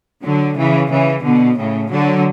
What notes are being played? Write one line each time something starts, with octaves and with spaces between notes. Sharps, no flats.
D3 F#3
C#3 E3
C#3 E3
B2 D3
A2 C#3
D3 F#3